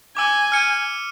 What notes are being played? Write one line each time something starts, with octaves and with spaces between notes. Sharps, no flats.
G#5 D6 E6
F6 C#7 D#7